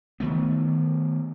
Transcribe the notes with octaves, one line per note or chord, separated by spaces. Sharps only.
D#3 E3 A3 B3